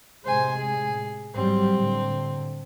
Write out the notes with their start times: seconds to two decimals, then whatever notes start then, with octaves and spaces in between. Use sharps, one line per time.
0.24 A2 C3 G#3 C5 G#5
0.57 G#4
1.34 G#2 F#3 G3 C4
1.73 A2 D3